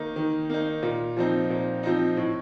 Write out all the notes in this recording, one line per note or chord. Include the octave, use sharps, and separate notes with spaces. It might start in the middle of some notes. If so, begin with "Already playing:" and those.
Already playing: D#3 A#3 D#4
D#3
A#3 D#4
A#2
F3 C4 D#4
A#2
F3 C4 D#4
A2